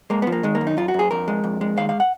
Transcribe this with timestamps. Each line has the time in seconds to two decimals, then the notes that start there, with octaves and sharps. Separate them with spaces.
0.10 G#3 A#3
0.22 B3
0.27 F3
0.32 A#3
0.43 D#3 G#3
0.55 A#3
0.61 F#2
0.67 D#4
0.77 F#2 F4
0.88 F#4
0.94 F#2 G#4
1.11 F2 A#4
1.28 G#3
1.44 F2
1.61 G#3
1.77 D#2 F5
1.89 F5
2.00 F#5